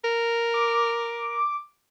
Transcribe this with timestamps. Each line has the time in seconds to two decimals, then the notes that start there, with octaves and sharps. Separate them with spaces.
0.04 A#4
0.54 D6